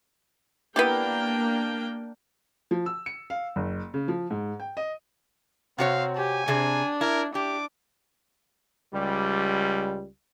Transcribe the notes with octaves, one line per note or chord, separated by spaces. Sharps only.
A#3 B3 D4 E4 G4 G5
F3
E6
C#7
F5
F#1
C#3
F3
G#2
G5
D#5
C3 C4 F#4 C#5 F5
G4 G#5
C3 C4 D4 G#4
E4 A#4
D4 G4 D6
C#2 G3